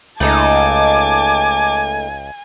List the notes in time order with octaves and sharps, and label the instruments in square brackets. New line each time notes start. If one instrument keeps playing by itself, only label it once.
[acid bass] C#2 [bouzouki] A3 D#4 A4 [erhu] G#5 [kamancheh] A5 D6